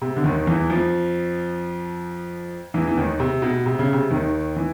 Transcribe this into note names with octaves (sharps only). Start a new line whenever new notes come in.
C3
D3
D#2 D#3
E2 E3
F2 F3
E2 E3
E3
D#2 D#3
C3
B2
C3
C#3
C3
D#2 D#3
E3